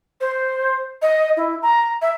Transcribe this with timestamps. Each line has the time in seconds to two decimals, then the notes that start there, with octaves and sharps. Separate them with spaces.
0.21 C5
1.02 D#5
1.37 E4
1.62 A#5
2.02 E5